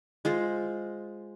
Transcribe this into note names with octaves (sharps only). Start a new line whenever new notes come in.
G#3 F4 C5